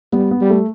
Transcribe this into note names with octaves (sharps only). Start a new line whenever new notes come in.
G3 B3
B3
G3
A3